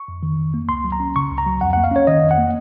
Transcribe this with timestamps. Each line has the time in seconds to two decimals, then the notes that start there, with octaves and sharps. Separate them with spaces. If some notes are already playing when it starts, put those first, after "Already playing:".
Already playing: C#6
0.08 F2
0.23 D#3
0.39 F2
0.54 A#3
0.69 C#2 C6
0.84 F#3
0.92 A#5
1.00 C#4
1.16 C#3 C#6
1.30 C#2
1.38 A#5
1.46 F#3
1.61 F2 F#5
1.73 A#3 F#5
1.84 F5
1.91 C#4 C#5
2.07 D#3 D#5
2.23 F2
2.31 F#5
2.38 A#3